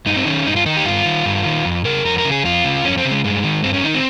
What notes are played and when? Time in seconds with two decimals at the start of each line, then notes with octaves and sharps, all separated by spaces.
0.06 G2 D#4
0.17 C4
0.26 D#3 C#4
0.46 G2 D#4
0.56 F4
0.66 D#3 D#4
0.77 G4
0.85 G2 F4
1.06 D#3
1.26 G2
1.45 D#3
1.65 F2
1.85 C#3 A#4
2.05 F2 A#4
2.18 A#4
2.25 C#3
2.31 G#4
2.45 F2 F4
2.65 C#3
2.84 F2 C#4
2.98 C4
3.05 C#3
3.11 G#3
3.24 G2 G#3
3.44 D#3
3.64 G2 C4
3.74 C#4
3.84 D#3 D#4
3.94 C4